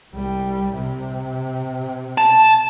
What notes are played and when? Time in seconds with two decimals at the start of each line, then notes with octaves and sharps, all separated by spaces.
0.14 C2 G3
0.77 C3
2.18 A5